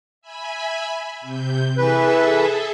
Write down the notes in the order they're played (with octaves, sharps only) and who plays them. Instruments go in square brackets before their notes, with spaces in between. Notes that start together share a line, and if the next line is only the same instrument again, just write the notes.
[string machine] E5 G#5 B5
C3 G6
[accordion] E3 B4 [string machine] G#4 A4 E5